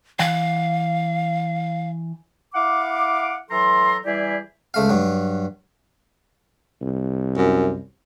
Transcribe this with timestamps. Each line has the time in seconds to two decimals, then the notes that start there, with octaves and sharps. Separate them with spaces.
0.19 E3 F5 F#5
2.55 E4 F5 F#5 D6
3.50 E3 F#3 A4 A#5 C6
4.05 E3 G3 E4 G4 G#4 D5
4.74 C#2 A3 F5
4.89 G2 F#3
6.82 C2
7.37 F#2